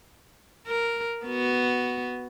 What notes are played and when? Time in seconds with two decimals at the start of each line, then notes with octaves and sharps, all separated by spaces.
0.67 A#4
1.25 B3 F#4